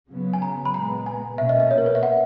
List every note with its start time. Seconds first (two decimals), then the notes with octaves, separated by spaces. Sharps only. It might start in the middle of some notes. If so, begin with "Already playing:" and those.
0.10 C#3 F#3 B3
0.33 G#5
0.42 A#5
0.65 B5
0.74 A#2 G#3 B3 A#5
1.06 G#5
1.38 B2 A#3 C#4 E5
1.49 D#5
1.60 D#5
1.71 C#5
1.78 A#4
1.86 B4
1.95 E5
2.03 F#5